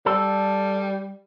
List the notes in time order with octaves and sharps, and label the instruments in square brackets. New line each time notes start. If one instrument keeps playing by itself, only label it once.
[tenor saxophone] G3 [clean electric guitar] A4